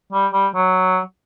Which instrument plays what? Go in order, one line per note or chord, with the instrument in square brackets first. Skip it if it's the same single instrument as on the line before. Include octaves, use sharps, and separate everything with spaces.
[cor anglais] G3
G3
F#3